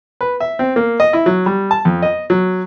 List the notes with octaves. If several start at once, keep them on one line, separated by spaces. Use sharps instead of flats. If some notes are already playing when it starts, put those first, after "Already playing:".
B4
E5
C4
A#3
D#5
E4
F#3
G3
A5
F2
D#5
F#3